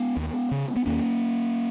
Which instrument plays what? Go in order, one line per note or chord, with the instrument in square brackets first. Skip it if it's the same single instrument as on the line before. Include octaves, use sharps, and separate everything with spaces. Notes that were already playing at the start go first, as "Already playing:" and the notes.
Already playing: [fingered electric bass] G#3 B3
D#2
C#3
B3
D#2 A#3 C#4